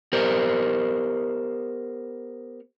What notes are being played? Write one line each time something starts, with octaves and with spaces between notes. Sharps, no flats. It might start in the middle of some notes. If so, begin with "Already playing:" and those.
B3 G4 A#4 C5